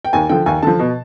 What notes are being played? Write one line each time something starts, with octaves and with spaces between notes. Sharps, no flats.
G5
D#2 G#5
D3 F3 G5
D#2 G#5
D3 F3 A5
B2